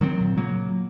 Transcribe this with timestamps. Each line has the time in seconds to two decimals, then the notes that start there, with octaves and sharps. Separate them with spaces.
0.01 D#3 F#3 A3 C4
0.21 A#2
0.36 A#2 C#3 F#3 A#3